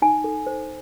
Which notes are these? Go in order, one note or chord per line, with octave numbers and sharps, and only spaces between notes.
D#4 G#5
A4
C5